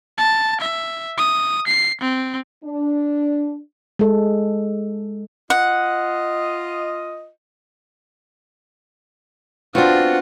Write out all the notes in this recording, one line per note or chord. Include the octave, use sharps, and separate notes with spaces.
A5
E5
D#6
C7
C4
D4
G#3 A4
F4 D#5 F#5
B3 C4 D4 F4 F#4 F#5